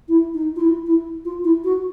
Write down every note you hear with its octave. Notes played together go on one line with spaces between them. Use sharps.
E4
D#4
F4
E4
E4
F4
E4
F#4